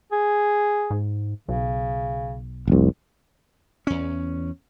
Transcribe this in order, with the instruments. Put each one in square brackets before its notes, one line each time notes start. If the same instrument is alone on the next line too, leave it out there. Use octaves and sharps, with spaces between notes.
[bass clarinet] G#4
[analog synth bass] G#2
[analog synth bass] B1 [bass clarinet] C#3
[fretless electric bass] F1 C2
[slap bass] E2 C#4